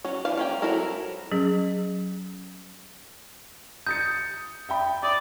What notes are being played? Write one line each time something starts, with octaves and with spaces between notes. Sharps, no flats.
F#3 C#4
E3 D4 F5
A#3 C#4 G5
F#3 C4 E4 A4 A#4
F#3 C#4 G#4
D#6 G6 A6 C#7
E5 G5 B5
D5 D#6